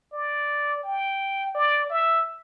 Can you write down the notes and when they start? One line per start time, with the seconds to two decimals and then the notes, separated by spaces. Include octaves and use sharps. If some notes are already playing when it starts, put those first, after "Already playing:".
0.13 D5
0.83 G5
1.55 D5
1.90 E5